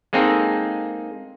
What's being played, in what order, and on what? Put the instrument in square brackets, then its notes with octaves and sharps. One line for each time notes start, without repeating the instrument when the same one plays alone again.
[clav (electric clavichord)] G#3 A#3 C4 D#4 G#4 A4